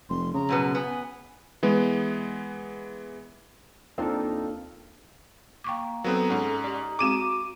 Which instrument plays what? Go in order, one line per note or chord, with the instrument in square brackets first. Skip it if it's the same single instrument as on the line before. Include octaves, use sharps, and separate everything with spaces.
[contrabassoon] F1 [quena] C6
[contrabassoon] C#3 [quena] A#5
[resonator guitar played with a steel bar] F#2 B2 B3
[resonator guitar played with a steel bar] B3 [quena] G#5
[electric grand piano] E3 G#3 B3
[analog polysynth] D#2 D#4 [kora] A#3 F4 F5 [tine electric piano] C4 D4 A4
[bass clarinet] A#3 [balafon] G5 C#6 D6
[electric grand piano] F#3 B3 C4 [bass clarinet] D#4 [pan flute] A4 [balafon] A#4
[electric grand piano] G#2 C#4 [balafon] F#5
[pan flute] G4 [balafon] D5
[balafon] G#3 C4 G#4 [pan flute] F#4 [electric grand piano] D6 D#7 E7